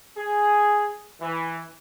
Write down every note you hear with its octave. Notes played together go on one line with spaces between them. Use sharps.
G#4
E3